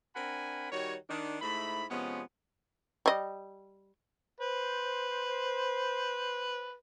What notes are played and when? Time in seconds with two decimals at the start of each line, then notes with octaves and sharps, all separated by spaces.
0.16 C4 D4 A#4 F#5 G#5 B5
0.71 D#3 G3 F#4 C#5
1.09 D#3 D4
1.42 G#2 A3 E4 B5
1.91 C3 F3 G#3 B3 C#4
3.06 G3 D#5
4.40 B4 C5